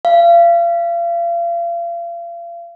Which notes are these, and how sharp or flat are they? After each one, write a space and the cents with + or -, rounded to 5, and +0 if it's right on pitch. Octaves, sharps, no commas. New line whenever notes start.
F5 -35